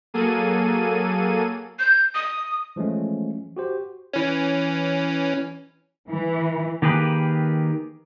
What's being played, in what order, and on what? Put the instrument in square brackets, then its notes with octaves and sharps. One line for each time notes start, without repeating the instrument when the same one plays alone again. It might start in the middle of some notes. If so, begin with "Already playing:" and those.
[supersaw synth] F#3 A#3 G#4 A4 D#7
[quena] G6
D#6
[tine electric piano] E3 F3 G#3 A3 C#4
F#4 G4 C5
[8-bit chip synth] E3 C#4
[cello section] E3
[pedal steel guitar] D#3 A#3 G4 G#4 B4